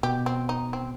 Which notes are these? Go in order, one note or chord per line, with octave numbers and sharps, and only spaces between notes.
B2 G4
C4
D#4
C4